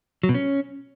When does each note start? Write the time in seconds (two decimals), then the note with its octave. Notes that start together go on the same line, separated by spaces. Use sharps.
0.23 F#3
0.29 B2
0.34 C#4